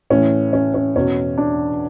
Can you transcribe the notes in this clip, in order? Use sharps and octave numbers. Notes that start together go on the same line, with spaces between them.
A2 E3 C#4
C#4
C#4
E2 B2 C#4
D4